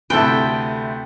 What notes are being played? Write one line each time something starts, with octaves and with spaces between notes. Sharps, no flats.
D2 C3 E4 A4 B4 G5